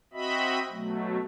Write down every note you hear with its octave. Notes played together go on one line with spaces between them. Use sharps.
C4 F#4 D#5 E5 B5
B2 F#3 A3